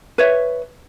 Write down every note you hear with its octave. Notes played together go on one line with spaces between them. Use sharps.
B4 C#5 E5